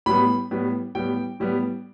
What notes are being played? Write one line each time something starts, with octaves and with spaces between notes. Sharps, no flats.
A2 G3 B3 B5
A2 G3 B3
A2 G3 B3 G5
A2 G3 B3